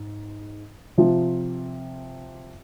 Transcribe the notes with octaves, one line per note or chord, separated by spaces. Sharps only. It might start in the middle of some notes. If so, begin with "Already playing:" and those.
Already playing: G#2
C3 F3 C4 F4